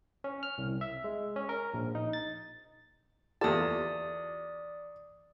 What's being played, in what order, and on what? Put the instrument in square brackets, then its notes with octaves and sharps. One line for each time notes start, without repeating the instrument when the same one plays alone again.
[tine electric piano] C#4
F6
C2
E5
G#3
C#4
A#4
A#1
D#4
A6
[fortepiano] E2 A5 [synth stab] F4 G4 A4 [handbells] D5 D#6